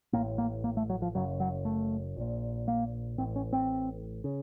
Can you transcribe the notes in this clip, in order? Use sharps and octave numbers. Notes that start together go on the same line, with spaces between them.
A1 A2 A#3
A#3
A#3
A3
F#3
F3
F#1 F#2 C#3 F#3
F#3
A3
A#1 A#2
A#3
A1 A2 C4
C#4
C4
C#3